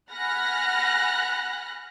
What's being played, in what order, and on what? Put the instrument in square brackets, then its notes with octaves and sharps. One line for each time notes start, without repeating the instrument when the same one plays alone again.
[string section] F#5 G#5 B5 F6 F#6 A#6